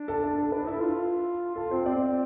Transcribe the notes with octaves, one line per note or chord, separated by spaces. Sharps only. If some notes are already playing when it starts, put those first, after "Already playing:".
Already playing: D4
A4
A4
D4 A4
D4 B4
E4 A4
F4
F4 A4
C4 C5
C4 D5